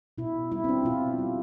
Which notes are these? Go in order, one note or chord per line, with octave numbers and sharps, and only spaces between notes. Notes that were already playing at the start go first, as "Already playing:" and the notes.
B2 E4
G3 E4
C4
D4
B2 F4
G3